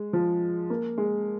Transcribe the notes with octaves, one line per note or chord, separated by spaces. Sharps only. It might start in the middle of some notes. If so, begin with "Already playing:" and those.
Already playing: G#3
F3
A#3
G#3